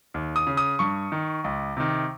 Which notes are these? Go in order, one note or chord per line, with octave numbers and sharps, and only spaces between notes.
D#2
D#6
C#3
D#6
G2 C#6
D#3
C#2
C3 D#3